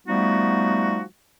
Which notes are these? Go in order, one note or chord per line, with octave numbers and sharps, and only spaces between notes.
F3 G3 A3 B3 D#4 F#4